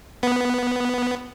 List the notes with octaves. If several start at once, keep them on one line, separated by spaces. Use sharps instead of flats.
B3